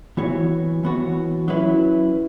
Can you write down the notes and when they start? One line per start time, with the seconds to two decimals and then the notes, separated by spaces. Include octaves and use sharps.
0.17 E3 B3 F#4 C#5
0.83 E3 B3 F#4 C#5
1.48 F#3 C#4 E4 B4